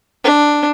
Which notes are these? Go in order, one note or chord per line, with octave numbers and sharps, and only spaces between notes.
D4